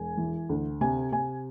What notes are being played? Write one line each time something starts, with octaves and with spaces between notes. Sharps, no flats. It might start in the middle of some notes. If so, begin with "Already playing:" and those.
Already playing: E1 G#5
E3
D2
C3 G#5
C3 G#5